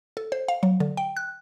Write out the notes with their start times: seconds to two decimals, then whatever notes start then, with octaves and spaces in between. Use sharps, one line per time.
0.17 A4
0.32 C5
0.48 F5
0.63 F#3
0.80 D3
0.97 G5
1.17 F#6